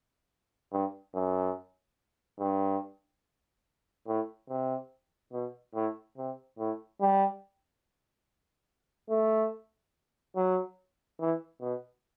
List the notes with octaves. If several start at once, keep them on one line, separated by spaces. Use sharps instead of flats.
G2
F#2
G2
A2
C3
B2
A2
C3
A2
G3
A3
F#3
E3
B2